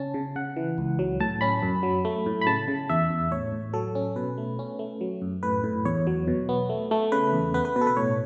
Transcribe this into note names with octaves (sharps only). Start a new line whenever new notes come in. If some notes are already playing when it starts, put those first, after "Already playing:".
Already playing: C#3 C#4 A5
C#3
C#3 F#5
E3
C#2
F#3
A2 A5
C#4 B5
F#2
F#3
A3
A2
B5
C#3 A5
C#3
E2 E5
E2
A2 C#5
A2
F#3 A4
C#4
B2 B4
A3
C#4
A3
F#3
F#2
A2 B4
A2
E2 C#5
F#3
B2
B3
A3
A3
C#3 B4
E2
B3 B4
B4
B2 B4
A4
B4
A2 C#5